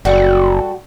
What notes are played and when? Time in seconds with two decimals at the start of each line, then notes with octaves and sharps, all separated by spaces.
0.05 F#1 G3 F#4 A4